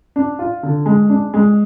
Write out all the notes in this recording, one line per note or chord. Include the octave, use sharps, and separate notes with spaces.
D4
F4
D3
G#3
D4
G#3